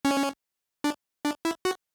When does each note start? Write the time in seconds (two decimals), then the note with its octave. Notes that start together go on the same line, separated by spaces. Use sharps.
0.05 C#4
0.84 D4
1.25 D4
1.45 E4
1.65 F#4